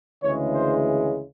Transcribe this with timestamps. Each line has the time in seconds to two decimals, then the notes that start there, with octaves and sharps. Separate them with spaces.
0.22 D2 C#3 E3 G#3 C#5
0.54 C5